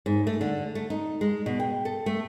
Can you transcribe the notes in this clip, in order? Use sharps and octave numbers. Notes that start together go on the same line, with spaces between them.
G#2
A3
D3
A3
D#4
G#3
B2
G5
A4
A3